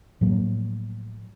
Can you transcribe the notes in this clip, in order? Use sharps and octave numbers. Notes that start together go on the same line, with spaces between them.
A2 F3 F#3 A#3